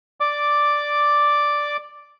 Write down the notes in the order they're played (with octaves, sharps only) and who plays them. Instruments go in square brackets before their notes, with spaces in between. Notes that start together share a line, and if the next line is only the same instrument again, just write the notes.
[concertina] D5 D6